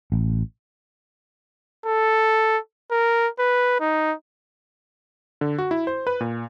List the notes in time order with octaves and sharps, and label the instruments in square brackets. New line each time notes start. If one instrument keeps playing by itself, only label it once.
[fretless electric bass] A1
[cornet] A4
A#4
B4
D#4
[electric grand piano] D3
F#4
E4
C5
B4
A#2